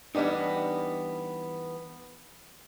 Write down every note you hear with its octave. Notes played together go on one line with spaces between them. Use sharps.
E3 G3 B3 D4 D#4